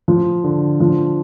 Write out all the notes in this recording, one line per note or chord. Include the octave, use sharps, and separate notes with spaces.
F3
D3
F3